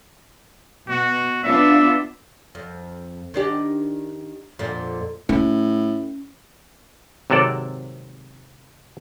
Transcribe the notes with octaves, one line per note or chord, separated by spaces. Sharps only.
B2 F#4
B3 D4 F4 E5
F2
D#3 D4 G4
F2 A#2 D3
A2 C#4
G#1 C3 F#3 A4 D5